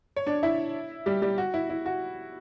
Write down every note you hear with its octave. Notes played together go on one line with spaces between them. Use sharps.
C#5
D4 D5
E4 E5
G3 G4
G3 G4
F#4
E4
E4
F#4